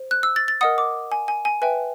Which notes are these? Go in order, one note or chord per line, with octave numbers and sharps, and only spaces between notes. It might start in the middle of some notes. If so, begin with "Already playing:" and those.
Already playing: C5
F#6
E6
A6
A6
A#4 D#5 F#5 D#6
D6
G#5
G#5
G#5
B4 E5 G5 G#5